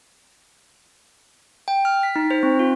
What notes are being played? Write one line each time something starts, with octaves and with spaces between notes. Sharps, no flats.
G5
F6
B6
D#4
C5
C4
F4